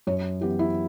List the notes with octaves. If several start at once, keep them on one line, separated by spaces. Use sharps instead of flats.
F#2 C#5
E3 B3 G4
E4